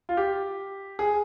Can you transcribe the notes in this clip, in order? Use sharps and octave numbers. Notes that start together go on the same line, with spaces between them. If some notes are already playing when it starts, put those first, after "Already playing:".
F4
G4
G#4